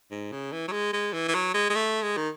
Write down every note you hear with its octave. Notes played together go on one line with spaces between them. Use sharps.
G#2
C#3
E3
F#3
G#3
G#3
E3
E3
F#3
G#3
G#3
A3
G#3
D#3